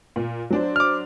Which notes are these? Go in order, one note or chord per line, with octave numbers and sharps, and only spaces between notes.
A#2
F#3 D4 C5
D6 F6